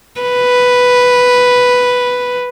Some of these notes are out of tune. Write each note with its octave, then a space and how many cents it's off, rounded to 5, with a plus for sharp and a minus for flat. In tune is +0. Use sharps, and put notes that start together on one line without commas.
B4 +0